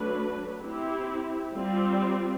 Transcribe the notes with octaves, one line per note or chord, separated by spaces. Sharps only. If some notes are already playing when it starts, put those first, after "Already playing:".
Already playing: F#3 A3 D4 F#4 B4
C4 E4 G4
G3 C4 F4